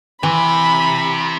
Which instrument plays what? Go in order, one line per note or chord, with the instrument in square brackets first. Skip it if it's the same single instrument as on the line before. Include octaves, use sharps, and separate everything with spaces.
[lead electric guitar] C3 [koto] E3 [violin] B5